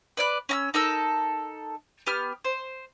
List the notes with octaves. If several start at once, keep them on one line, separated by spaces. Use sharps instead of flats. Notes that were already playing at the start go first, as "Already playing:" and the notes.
B4 D5 F#6
C#4 A#5 E6
D#4 A4 A#4 E6
B3 G4 F6
C5